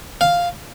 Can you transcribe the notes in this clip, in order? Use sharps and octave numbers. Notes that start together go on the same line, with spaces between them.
F5